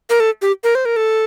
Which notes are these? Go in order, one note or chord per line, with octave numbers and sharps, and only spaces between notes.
A#4
A4
G4
A#4
C5
A#4
A4